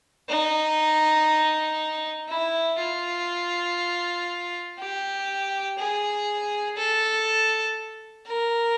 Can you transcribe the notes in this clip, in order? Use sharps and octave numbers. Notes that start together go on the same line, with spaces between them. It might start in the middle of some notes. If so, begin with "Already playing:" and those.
D#4
E4
F4
G4
G#4
A4
A#4